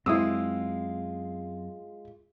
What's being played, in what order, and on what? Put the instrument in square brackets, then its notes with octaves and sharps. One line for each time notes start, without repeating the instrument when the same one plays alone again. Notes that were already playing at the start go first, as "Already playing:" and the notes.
[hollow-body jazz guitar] F#2 [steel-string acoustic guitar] G#3 F4 [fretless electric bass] C4 [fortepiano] E4 D#6 E6